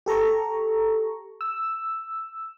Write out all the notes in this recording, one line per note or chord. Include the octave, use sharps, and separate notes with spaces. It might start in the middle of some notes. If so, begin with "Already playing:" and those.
G4 A4 A#5 C#6
E6